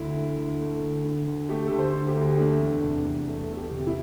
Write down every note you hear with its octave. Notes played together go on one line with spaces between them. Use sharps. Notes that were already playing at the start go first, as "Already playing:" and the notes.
Already playing: D2 E4
D3
D2
A3
D2
D3
D2
A3 G4
D2 A4
C5
D3
G4
D2
A3 D4
E2
C3
E2
A3
E2 A4
G4
C3
E4